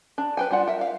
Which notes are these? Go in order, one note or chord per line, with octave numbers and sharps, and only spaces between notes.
D4
B4 G5 G#5
G3 D4 F4 F#5
A#4 E5
F5